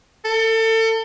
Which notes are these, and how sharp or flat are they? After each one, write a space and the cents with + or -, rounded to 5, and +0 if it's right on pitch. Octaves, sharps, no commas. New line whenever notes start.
A4 +30